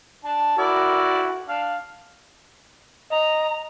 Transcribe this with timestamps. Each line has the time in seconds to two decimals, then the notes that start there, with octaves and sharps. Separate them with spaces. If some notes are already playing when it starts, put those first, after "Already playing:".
0.24 D4 A5
0.58 E4 F#4 A#4 D5
1.48 D4 F5
3.11 D#5 A#5